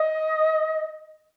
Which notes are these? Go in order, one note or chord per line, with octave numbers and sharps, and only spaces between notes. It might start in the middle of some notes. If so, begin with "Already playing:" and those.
Already playing: D#5